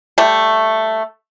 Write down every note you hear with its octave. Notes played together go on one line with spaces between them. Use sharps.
G3 A3